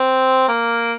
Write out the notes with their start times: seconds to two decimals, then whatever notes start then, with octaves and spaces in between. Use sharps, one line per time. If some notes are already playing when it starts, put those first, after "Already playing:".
Already playing: C4
0.48 A#3